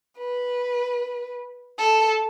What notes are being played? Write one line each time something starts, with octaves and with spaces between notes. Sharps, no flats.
B4
A4